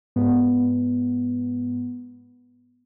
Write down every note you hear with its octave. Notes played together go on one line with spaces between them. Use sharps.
G#2 B3